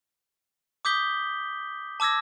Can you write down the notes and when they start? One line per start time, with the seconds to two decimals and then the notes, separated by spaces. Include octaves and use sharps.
0.85 D6 D#6 G6 B6 G7
2.00 A5 D6 E6 G#6 A#6